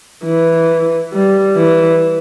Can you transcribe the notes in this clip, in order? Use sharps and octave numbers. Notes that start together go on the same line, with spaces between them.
E3
G3
E3